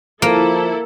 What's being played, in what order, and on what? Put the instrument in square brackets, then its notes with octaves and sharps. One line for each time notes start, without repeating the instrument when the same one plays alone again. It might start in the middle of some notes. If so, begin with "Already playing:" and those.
[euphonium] F3 [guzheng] A#3 [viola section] E4 A4